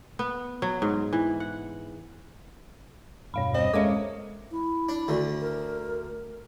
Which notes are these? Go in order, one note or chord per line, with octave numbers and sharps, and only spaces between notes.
B3
F#3
G#2
E3
F#5
E2 G2 B2 C#5 F5 B5
G3 C4 D#5
G#3 A#3 C#4 A4 C#5 E5 F5 D6
E4
D4
D2 D3
A#4